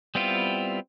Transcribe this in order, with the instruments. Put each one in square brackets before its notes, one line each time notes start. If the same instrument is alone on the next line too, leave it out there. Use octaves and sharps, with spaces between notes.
[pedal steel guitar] G3 B3 C4 E4 F4